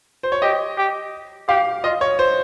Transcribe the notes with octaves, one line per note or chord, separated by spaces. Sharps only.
C5
C#5
G4 D#5
G4
G4 F5
F4 D#5
C#5
C5